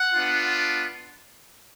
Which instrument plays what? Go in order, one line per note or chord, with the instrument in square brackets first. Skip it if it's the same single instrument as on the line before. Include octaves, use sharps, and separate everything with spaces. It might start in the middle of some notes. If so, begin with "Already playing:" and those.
Already playing: [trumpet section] F#5
B3 D4 F4